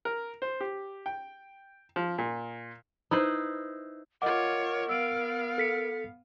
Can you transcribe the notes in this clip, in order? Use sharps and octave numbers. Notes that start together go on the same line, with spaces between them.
A#4
C5
G4
G5
F3
A#2
D#4 E4 B4 C5
F4 A#4 C#5 D#5 F#5 D6
B3 F5 E6 D7
A4 B6 C#7